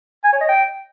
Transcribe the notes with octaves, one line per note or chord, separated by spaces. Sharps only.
G#5
C#5
D#5
G5